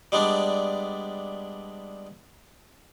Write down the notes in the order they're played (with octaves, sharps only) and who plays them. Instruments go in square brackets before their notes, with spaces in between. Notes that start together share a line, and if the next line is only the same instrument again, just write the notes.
[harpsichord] G3 G#3 B3 D4